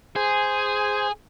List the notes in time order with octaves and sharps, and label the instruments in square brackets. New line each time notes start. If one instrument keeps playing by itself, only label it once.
[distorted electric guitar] G#4 [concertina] C5 G#5